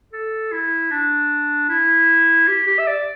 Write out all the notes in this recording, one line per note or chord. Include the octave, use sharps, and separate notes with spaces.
A4
E4
D4
E4
G4
G4
E5
D5